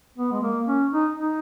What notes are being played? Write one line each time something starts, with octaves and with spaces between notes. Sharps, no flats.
B3
G#3
A#3
C#4
D#4
D#4